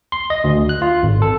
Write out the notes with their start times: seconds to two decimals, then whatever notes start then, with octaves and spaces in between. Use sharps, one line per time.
0.12 C6
0.30 D#5
0.44 D2
0.69 F#6
0.82 F4
1.03 G#1
1.22 A4